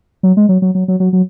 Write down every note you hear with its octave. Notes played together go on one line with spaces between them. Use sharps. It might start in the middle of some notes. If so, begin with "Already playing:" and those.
F#3
G#3
F#3
F#3
F#3
F#3
F#3
F#3